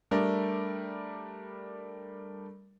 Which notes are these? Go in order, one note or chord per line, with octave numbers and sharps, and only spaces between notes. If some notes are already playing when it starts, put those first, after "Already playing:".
G3 A3 D4 A#4 D5